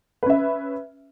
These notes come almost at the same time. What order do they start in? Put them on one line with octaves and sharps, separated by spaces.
B4 C#4 E5